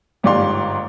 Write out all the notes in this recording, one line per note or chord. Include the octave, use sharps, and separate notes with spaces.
G1 G#2 G4 D5 F5 C6